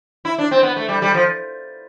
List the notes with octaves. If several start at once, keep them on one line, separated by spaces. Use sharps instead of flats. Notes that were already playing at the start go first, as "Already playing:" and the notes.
E4
D4
C4
B3
A3
G3
G3
F3